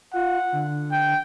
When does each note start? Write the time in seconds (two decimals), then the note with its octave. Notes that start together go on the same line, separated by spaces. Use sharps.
0.14 F4 F#5
0.52 D3
0.92 G5